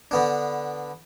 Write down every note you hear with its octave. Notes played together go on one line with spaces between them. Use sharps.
D3 B3 D4